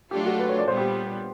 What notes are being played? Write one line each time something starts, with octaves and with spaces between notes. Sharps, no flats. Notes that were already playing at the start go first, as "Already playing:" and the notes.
F#3 A3 D4 F4 G4 A4
F#4
B4
C#5
D5
A#2 G3 B3 C5
G4